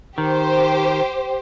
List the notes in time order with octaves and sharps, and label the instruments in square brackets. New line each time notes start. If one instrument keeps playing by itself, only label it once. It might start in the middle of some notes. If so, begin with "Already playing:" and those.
[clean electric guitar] D#3 [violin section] G4 C5